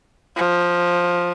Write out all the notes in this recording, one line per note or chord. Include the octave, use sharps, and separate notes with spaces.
F3